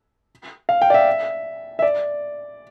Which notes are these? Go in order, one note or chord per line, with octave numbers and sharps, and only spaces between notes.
F5
G5
D5
E5
E5
D5